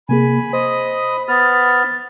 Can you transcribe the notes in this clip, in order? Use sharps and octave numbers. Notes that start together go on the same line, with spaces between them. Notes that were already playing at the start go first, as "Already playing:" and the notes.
C3 A#3 G#4 G#5 B5
C5 D#5 D#6
B3 B5 F6 A6